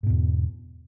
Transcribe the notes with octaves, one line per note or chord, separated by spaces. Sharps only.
E2 G#2 B2